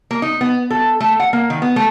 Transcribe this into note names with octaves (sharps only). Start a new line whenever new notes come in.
A#3
D#4
B3
A4
A3
F#5
A#3
D#3
B3
A3